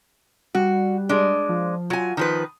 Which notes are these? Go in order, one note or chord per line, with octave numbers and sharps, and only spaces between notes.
G3 F#4
G#3 D4
F3
F#3 F4 G#5
D#3 F3 B4 D#6